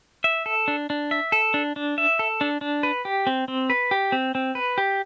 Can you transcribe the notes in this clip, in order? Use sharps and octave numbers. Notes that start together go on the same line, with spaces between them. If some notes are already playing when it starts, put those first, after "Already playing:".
E5
A4
D4
D4
E5
A4
D4
D4
E5
A4
D4
D4
B4
G4
C4
C4
B4
G4
C4
C4
B4
G4